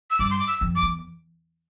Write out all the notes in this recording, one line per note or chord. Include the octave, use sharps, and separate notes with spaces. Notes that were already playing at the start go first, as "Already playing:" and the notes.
E6
G2 D6
C6
D6
E6
F2
D6
E2